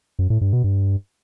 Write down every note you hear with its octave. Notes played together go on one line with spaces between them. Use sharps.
F#2
A2
G2
B2
G2